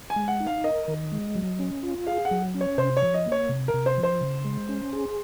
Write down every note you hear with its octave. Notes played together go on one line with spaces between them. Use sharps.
G#5
G#3
F#5
D#4
F5
A#4 D#5
D#3
G#3
F#3
C#4
F4
G#4 F5
F#5
F#3
C#4
C#5
C3 C5
C#5
F3
D#5
A#3
C#5
C3
A#4
C3
C5
F3
C5
C#3
G#3
C#4
G#4